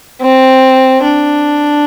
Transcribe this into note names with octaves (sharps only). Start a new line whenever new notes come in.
C4
D4